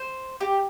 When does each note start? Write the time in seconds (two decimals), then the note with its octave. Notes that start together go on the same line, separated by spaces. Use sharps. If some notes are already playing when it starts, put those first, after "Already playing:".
Already playing: C5
0.41 G4